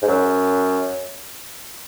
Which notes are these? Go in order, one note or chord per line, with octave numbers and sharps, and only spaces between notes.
G#2
F#2